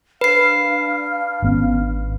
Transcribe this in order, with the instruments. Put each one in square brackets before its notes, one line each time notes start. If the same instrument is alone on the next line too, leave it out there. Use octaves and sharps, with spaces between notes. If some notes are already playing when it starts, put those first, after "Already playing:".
[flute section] D4 F5 F6 [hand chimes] B4 C7
[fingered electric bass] G#1 B3 C#4